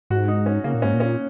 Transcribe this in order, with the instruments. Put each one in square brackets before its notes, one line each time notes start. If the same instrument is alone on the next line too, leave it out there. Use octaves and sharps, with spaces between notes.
[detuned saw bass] G#2 [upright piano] F#4
[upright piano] D#4
C#4
[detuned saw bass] C#3 [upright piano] A#3
[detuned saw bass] A#2
[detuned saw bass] G#2 [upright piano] C#4
[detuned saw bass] A#2
[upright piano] C#4